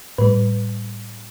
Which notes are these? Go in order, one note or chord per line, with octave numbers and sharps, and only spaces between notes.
A2 G3 B4